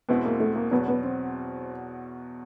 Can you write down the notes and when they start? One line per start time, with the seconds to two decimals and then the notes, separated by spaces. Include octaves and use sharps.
0.09 E2 B2 G#3 B3 C4 E4
0.25 A#3
0.40 A3
0.56 A#3
0.71 E2 B2 F#3 B3
0.88 B3
1.03 C4